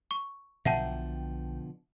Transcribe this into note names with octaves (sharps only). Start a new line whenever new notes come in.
C#6
B1 B2 D3 F3 E5 F#5 G5 A5